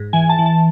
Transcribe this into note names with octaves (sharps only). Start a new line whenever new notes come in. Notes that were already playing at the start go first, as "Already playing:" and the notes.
Already playing: G#2
E3 G#5
A5
E3
A5